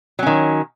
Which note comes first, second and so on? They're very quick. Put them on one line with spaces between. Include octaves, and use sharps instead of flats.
F#3 C#4 D#3